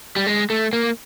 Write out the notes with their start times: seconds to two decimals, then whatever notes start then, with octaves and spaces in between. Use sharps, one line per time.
0.16 G3
0.27 G#3
0.50 A3
0.73 A#3